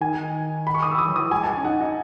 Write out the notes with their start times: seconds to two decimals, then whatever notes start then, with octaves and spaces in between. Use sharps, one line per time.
0.01 D#3 G#5
0.67 B5
0.74 C#6
0.83 D#6
0.91 E6
0.98 E3 D#6
1.08 F#3
1.16 E3 D#6
1.31 G#3 G#5
1.43 A5
1.47 G#5
1.57 C#4
1.64 D#4 F#5
1.80 D#4 D#5